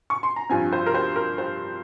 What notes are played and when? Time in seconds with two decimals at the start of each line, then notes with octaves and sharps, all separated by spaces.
0.10 C#6
0.23 C6
0.36 A#5
0.49 G2 F3 C4 G#5
0.73 C5
0.86 A#4
0.94 C5
1.16 A#4
1.38 C5